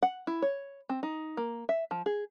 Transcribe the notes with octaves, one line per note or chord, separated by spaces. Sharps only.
F#5
E4
C#5
C4
D#4
A#3
E5
F3
G#4